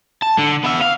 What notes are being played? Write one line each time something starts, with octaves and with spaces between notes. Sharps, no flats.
A5
D3
B3 E5
F5